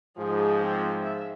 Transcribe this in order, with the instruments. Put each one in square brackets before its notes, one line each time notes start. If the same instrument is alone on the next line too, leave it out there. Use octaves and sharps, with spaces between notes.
[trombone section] G#2 F3 [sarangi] G#4
[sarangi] C4
E5